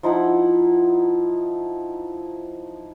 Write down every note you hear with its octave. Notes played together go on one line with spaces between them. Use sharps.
F3 D#4 E4 F#5